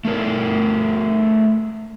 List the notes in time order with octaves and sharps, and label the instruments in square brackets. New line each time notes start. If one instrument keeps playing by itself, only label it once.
[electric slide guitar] A3 A4 A#4 D5